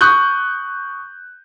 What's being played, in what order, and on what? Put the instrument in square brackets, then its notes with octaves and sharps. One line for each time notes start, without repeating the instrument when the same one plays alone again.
[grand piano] C#6 D#6 F#6 G6